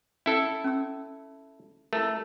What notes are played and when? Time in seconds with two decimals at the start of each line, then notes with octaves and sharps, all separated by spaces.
0.26 C#4 E4 A4
0.64 C#4 E6
1.93 A3 E4 A4 A#4